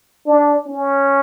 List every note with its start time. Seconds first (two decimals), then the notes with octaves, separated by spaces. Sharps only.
0.26 D4
0.67 C#4